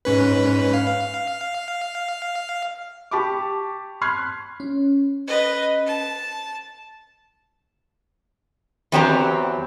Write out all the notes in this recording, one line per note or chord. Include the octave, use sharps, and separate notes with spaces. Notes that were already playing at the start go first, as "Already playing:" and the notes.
G#2 C#4 B4
F5
G4 A5 B5 C#6 D6
B5 C6 F6 F#6 G#6 C7
C#4
B4 D#5
A5
E2 F#3 C4 G4 G#5 A#5